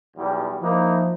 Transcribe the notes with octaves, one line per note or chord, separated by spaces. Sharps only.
B1 E2 G3
F3 A#3 D#4 E4